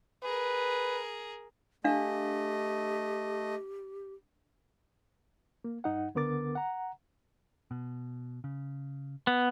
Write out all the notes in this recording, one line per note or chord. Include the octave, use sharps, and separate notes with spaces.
G#4 A#4 B4
A3 D4 G4 D#5 F5
A#3
G2 D#4 F#5
C#2 D3 B3 A#4 D6 A6
F#5 A#5
B2
C#3
B3